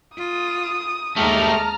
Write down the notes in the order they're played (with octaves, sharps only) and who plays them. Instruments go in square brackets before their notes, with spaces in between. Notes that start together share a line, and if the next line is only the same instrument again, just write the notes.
[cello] F4 [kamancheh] D#6
[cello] D#2 G#3 [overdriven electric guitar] A3 G4 [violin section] A5 A#5 F6